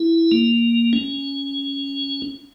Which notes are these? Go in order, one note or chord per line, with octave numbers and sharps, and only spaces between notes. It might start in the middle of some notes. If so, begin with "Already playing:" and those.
Already playing: E4
A#3
C#4